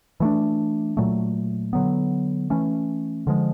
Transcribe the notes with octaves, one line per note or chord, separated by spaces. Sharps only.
E3 A3 D4
A#2 F#3 A3
D3 F#3 B3
E3 A3 C#4
D3 F3 G#3